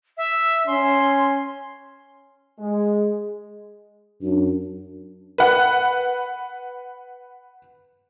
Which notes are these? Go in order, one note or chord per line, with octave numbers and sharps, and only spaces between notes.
E5
C#4 C6
G#3
F#2 D4
B4 F#5